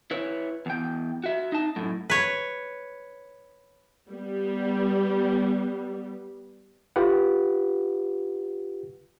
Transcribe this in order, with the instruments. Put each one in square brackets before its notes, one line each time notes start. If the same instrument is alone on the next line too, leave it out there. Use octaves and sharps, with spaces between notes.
[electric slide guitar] E4 B4 C#5
E2 G5
F#4 E5
D#4 A5
F#2 A2
[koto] B4 C#5
[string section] G3 B3
[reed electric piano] F4 G4 B4 F#5